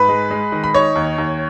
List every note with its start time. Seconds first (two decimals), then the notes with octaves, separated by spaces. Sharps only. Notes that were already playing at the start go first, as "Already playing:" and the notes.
Already playing: G#2 B4 B5
0.09 G#3
0.31 G#3
0.52 D#3
0.64 B5
0.74 D#4 C#5 C#6
0.95 D#2
1.18 D#2